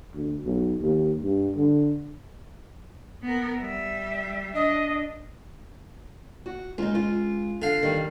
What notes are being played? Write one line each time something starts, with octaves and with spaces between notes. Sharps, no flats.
D2
B1
D#2
G2
D3
B3 A#4
G3 E5
D4 D#5
F#4
C#2 D#4 F4
F4
D3 F5
D#3 G3